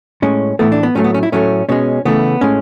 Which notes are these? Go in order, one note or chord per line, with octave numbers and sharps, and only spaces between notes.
A2 G#3 C#4
A2 E3 A3 B3
D4
B3
A2 F#3 A3 C#4
B3
C#4
E4
A2 F#3 A3 C#4
B2 G#3 C#4
C#3 E3 A3 B3
A2 G#3 C#4